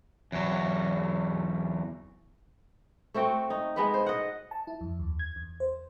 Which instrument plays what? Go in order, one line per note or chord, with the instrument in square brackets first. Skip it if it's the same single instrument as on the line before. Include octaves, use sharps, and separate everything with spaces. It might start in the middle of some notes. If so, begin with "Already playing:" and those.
[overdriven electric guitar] E2 F#3
[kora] A3 C4 F#4 G5
D#4
G#3 B3 B4
C5
D#5 F#5
[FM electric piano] A5
E4
F2
D#2
G#6
E2
C5